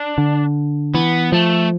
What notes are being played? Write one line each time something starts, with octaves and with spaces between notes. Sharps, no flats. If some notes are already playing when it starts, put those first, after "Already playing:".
Already playing: D4
D3
E3 B3
F3 A3